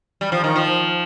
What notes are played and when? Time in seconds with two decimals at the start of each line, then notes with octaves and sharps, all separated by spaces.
0.21 G3
0.32 F3
0.44 D#3
0.56 F3